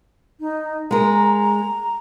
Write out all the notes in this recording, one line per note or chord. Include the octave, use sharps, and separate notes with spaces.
D#4
G#3 A#4 A#5